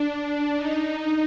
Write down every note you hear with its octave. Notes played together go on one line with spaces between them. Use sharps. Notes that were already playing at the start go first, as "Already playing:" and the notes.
Already playing: D4
D#4